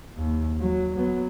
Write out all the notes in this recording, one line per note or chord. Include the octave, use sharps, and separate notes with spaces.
D#2
F#3
F#3 B3